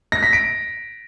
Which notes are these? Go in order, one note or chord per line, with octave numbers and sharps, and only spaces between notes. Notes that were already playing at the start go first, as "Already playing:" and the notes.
A#6
B6
D7